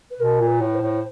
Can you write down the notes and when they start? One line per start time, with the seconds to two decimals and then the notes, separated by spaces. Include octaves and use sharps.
0.10 B4
0.20 B2 A#4
0.40 A#2
0.47 B4
0.60 A2
0.74 C5
0.81 A2